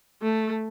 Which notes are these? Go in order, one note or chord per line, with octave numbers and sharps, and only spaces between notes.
A3